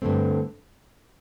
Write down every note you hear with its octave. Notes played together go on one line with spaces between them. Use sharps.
G2 D3 A3 C4